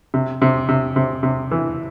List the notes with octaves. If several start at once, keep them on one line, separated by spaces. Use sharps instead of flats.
C3
C3
C3
C3
C3
E3